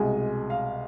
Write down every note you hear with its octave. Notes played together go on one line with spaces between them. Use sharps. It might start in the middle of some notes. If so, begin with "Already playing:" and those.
Already playing: C2 B2 G#3 G#5
F5